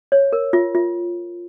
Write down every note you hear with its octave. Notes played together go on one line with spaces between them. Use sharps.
C#5
A#4
F4
F4